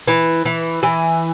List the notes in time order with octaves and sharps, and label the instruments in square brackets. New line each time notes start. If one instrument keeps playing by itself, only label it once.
[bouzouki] E3
E3
E3